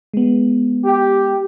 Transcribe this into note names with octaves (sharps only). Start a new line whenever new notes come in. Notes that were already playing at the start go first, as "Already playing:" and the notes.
G#3 B3
G4